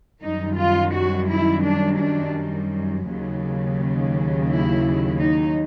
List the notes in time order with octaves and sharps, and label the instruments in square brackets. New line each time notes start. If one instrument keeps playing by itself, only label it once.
[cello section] F#2 D#3 G3 D#4
F4
F#4
E4
D4
D4
D#2 C#3 F#3
E4
D#4